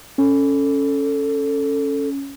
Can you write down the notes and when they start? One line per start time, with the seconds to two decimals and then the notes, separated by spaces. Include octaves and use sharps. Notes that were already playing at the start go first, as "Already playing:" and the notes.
0.18 C#4 A4